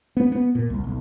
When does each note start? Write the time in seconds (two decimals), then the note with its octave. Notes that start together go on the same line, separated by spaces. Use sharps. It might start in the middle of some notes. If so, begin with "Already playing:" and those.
0.17 B3
0.32 B3
0.55 A#2
0.70 C2
0.84 B1